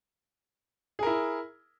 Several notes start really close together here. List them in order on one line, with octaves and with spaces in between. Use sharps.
G#4 A#4 E4